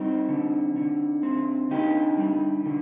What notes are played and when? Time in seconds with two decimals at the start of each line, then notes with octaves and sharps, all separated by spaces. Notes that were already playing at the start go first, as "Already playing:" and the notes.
Already playing: G3 C4 D#4
0.29 D3
0.76 D3
1.23 C4
1.71 D3 D#4 G4
2.17 G3
2.66 D3